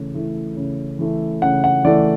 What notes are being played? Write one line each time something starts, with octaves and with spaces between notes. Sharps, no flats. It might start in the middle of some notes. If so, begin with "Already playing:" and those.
Already playing: C#3 E3 A3
E3 A3 E4
C#3
E3 A3 E4
C#3 F#5
F#5
E3 A3 E4 D5